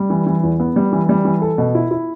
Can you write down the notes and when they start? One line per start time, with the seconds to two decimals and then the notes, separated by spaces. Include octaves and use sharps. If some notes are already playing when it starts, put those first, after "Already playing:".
Already playing: G3
0.10 E3
0.27 E3
0.43 E2
0.60 B3
0.76 G3
0.93 E3
1.09 G3
1.25 E3
1.42 A4
1.58 B2
1.75 E4
1.91 E4